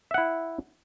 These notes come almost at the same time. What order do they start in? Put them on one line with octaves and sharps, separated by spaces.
E5 F#5 E4